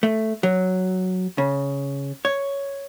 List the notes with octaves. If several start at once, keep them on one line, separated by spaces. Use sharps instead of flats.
A3
F#3
C#3
C#5